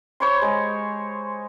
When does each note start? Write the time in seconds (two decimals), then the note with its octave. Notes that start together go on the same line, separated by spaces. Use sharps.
0.20 C5 C#5 B5 C6
0.42 G#3 G#4